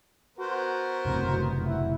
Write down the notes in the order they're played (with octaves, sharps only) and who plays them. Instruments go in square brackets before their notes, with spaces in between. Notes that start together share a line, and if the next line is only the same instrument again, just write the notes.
[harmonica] B3 A#4 C5 [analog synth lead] F#4
[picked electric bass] F#1 A2 C3
[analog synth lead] E4 [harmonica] F#5